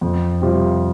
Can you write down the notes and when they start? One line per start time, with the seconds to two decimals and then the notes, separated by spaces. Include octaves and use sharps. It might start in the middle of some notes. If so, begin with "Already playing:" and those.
0.01 F2
0.41 C3 G3 C4 F4